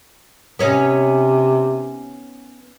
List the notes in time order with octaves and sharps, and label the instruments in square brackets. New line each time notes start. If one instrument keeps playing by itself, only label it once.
[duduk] C3 [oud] B3 C#4 D#4